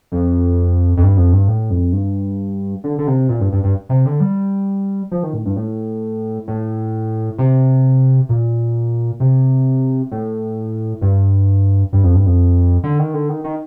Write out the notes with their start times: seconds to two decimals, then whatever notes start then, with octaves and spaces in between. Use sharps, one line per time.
0.12 F2
0.97 F2
1.03 G2
1.17 F2
1.33 G2
1.48 A2
1.70 F2
1.93 G2
2.84 D3
2.98 D3
3.07 C3
3.29 A#2
3.40 G2
3.52 G2
3.64 G2
3.89 C3
4.06 D3
4.20 G3
5.11 F3
5.23 D#3
5.33 A2
5.45 G2
5.56 A2
6.48 A2
7.38 C3
8.29 A#2
9.20 C3
10.11 A2
11.01 G2
11.93 G2
12.04 F2
12.15 G2
12.26 F2
12.84 D3
12.99 D#3
13.14 D3
13.29 D#3
13.44 D#3